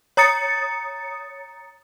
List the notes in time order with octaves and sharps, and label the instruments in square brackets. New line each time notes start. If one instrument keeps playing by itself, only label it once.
[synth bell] C#5 A#5 D#6 A6 C#7